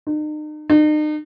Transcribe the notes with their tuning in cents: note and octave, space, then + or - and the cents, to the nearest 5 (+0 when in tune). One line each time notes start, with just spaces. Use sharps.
D#4 -40
D#4 -40